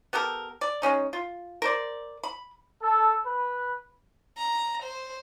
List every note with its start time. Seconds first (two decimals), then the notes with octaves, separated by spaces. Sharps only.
0.13 B3 G4 A4 A#4
0.61 D5
0.82 G#3 A#3 C#4 D#4
1.13 F4
1.62 A#4 C5 D5
2.23 B5
2.82 A4
3.24 B4
4.37 A#5
4.83 C5